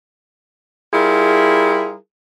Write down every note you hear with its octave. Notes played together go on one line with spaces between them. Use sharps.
G3 E4 F4 G#4 A#4